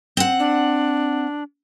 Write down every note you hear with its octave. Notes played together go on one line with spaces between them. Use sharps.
C4 F#5
D4